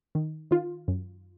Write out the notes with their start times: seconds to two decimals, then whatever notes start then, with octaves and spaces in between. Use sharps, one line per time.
0.15 D#3
0.51 D#3 F4
0.88 F#2